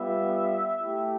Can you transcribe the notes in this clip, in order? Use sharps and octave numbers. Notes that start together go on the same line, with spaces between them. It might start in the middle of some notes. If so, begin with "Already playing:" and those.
Already playing: G3 B3 F4 E5
A3 E4 G4